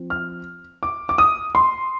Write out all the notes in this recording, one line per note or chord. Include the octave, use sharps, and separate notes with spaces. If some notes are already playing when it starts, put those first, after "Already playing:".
Already playing: F3 C4
F6
D6
D6
D#6
C6